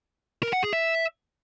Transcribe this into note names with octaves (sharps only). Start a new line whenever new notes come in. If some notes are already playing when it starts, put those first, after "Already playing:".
A#4
F#5
G#4
E5